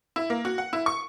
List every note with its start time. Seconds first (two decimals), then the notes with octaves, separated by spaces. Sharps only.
0.16 E4
0.30 A#3
0.45 F#4
0.58 F#5
0.73 E4
0.86 C#6